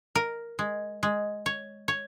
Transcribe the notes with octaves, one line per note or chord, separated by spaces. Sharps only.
A#4
G#3
G#3
C#5
C#5